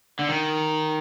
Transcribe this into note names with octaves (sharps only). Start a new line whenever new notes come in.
D3
D#3